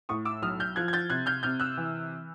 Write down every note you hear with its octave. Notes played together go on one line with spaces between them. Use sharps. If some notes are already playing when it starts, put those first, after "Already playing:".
A2 C#6 D#6
D6 E6
B1 D#6 F6
F6 G6
F3 F#6 G#6
G#6
G6 A6
C3 F#6 G#6
F6 G6
C3 F6 G6
E6 F#6
E3